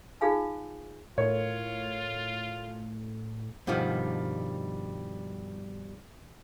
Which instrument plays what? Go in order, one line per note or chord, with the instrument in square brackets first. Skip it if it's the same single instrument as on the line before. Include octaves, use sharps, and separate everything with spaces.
[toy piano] D#4 F4 G#4 F5 G#5
[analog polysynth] A2 [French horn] F4 [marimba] A#4 [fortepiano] C#5
[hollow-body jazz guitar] G2 B2 D#3 F3 G3